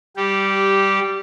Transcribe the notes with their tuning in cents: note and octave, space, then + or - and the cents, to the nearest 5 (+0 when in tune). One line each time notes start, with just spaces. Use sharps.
G3 +0 G4 -10